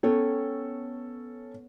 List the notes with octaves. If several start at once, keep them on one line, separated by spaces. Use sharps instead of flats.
B3 C#4 A4 C#5 G5